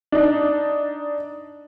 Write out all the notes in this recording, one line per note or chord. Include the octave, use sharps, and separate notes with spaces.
D4 D#4